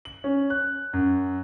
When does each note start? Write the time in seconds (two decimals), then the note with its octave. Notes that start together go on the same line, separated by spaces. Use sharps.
0.05 F#7
0.24 C#4
0.50 F#6
0.93 F#2